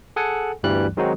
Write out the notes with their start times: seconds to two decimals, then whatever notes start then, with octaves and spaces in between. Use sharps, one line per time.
0.16 G#4 A4 F#5 G#5
0.63 G1 D2 G2 E3 G3 F#6
0.97 D#3 F#3 G#3 C4 D#4 F#4